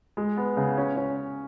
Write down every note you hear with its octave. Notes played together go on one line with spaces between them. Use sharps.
G#3
B3
C#3
C#4
C#4